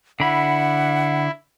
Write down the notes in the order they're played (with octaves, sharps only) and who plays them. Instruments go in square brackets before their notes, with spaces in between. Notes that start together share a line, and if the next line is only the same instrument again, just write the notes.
[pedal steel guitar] D3 B5 [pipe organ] E4 [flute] F#5